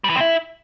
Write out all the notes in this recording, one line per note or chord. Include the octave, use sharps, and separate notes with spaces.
G3
E3
C3
E4